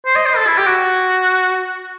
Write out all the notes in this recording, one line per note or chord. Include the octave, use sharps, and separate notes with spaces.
C5
D#5
C5
A4
E4
G4
F#4